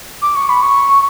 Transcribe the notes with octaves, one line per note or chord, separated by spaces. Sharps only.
D6
C#6
B5
C#6